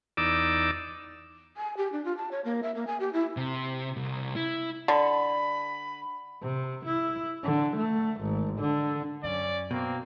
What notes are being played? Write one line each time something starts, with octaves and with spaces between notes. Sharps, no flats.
E2 D#4 D5 D6 E6
G#5
G4
D4
F4
A5
C#5
A#3
E5
A#3
G#5
G4
E4
C3
C2
E4
D3 B5
C3
E4
D3
A3
G#1
D3
F#2 C#4 D5
B2 A#3 C4